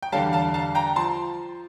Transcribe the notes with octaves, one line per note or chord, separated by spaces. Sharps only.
G5
E2 D3 G3 F5 A5
F5 A5
F5 A5
G5 A#5
F3 A5 C6